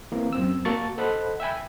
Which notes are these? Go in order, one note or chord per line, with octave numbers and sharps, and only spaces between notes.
E3 A#3 C4
F#2 C4 E6
A#3 F#4 A5 C#6 A6
A4 C5 D#5 F#5 B5 F#6
E5 G5 G#5 B5